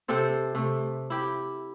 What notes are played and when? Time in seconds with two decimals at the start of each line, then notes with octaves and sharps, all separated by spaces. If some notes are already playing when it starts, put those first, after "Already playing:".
0.08 C3 C4 A4 C5
0.55 C3 A3
1.10 E4 G4